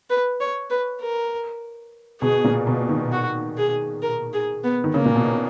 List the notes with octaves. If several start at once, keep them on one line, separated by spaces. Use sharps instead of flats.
B4
C#5
B4
A#4
B2 G#4
A#2
B2
D#3
F#4
G#4
A#4
G#4
B3
D#3
C#3 A#3
A#2
B2